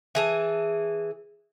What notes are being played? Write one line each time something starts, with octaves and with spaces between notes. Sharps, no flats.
E3 G#4 A5